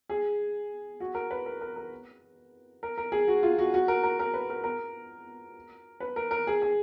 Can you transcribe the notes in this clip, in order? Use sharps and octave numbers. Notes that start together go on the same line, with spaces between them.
G#4
F#4
A#4
B4
A#4
A#4
A#4
A#4
A#4
G#4
F#4
F4
F#4
F#4
A#4
A#4
A#4
B4
A#4
A#4
B4
A#4
A#4
G#4
G#4